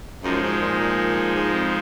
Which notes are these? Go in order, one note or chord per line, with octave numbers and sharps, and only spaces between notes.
F#2 F3 G#3 D#4
G#2
A#2
A#2
G#2
F2